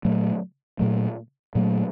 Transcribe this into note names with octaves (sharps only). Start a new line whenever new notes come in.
A#2 F#3 A3
A#2 F#3 A3
A#2 F#3 A3